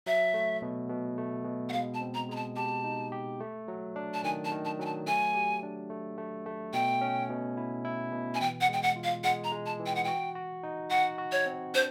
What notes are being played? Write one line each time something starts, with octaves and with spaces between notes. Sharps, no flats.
F#3 E5
A3
B2
B2
A3
B2
F#5
G#3 F5
A5
C4
A#5
G#3 A#5
A5
G4 A5
D#4
G4
A3
F#3
D4
A5
D#3 G#5
A5
D#3
A5
F#3 G#5
A5
A3 G#5
G4
D4
A3
A3
A3
B2 G5
C#4
B2
E4
E4
B2
G#5
E3 G5
F#5
G#3 G5
F#5
F4
F5
G#3 F#5
A#5
G#3
A5
E3
G5
F#5
F#4 G5
F#4
D#4
F#4 F#5
F#4
C#5
C4
D4 C5